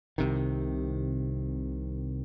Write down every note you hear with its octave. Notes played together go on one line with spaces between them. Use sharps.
C2 C3 D#3